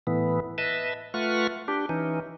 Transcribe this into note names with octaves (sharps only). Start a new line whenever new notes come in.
A2 E3 B3
B4 D#5 E5 A5
A3 F4 B4 F#5 C#6 F6
D4 G4
E3 C#4 D#4